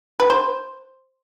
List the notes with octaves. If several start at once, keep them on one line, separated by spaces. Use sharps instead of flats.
B4
C5